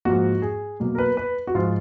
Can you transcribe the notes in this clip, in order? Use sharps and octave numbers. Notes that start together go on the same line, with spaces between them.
G#2 F3 A#3 F#4
G#4
B2 F#3 A#3
A#4
B4
B4
F#4
G#2 F3 G#3 F4